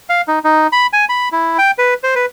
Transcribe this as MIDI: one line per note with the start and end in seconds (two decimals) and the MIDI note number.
0.09 0.21 77
0.28 0.39 63
0.44 0.67 63
0.72 0.87 83
0.93 1.05 80
1.09 1.29 83
1.32 1.58 64
1.58 1.71 79
1.78 1.94 71
2.03 2.14 72
2.15 2.26 71